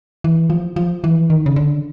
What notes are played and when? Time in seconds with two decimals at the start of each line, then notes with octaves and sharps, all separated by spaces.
0.24 E3
0.50 F3
0.76 F3
1.04 E3
1.30 D#3
1.46 C#3
1.56 D3